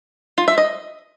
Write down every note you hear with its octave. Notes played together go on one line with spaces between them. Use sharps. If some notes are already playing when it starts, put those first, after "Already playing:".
F4
E5
D#5